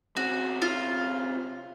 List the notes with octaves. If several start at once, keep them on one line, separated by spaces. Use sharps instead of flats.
C3 C#4 F#4
F4